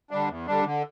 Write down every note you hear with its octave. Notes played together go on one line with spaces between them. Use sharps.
D3 G3 D4
E2
D3 G3 D4
D3